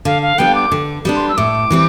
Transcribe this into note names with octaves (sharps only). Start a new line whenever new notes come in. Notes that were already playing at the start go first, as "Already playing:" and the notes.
D3 F5
F5
G3 B3 D4 G5
D6
D3
G3 B3 D4
C6
E6
A2 D6
E3 G3 C4